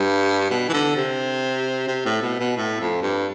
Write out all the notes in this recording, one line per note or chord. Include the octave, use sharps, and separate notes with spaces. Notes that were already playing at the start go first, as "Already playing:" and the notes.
Already playing: G2
B2
E3
D3
C3
C3
A2
B2
B2
A2
F2
G2